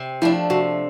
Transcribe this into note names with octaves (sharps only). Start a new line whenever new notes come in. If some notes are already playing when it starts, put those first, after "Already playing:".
Already playing: C3
F3 A3 D4 E4
C3 F#4